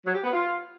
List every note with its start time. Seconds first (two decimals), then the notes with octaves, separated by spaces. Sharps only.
0.06 F#3
0.15 G4
0.24 B3
0.33 F4